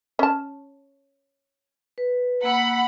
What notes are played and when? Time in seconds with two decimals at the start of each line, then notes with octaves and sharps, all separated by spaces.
0.19 C#4 A5
1.98 B4
2.43 A#3 F#5 B5 E6